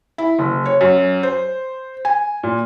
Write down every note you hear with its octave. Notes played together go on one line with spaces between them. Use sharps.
E4
F#1
C#5
F#2
C5
G#5
A#2